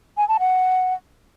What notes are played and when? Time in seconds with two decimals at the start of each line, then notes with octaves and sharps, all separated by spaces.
0.17 G#5
0.28 A5
0.40 F#5